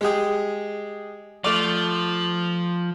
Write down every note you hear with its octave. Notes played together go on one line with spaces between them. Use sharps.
G#3 G4 G#4
F3 A3 D5